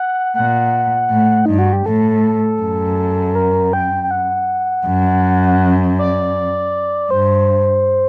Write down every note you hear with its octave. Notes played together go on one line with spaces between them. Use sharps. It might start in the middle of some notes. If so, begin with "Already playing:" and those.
Already playing: F#5
A#2 F#5
A2
G2 D#4
F#4
G4
A2 A4
F#2
A#4
G5
G5
F#5
F#2
D5
G2 C5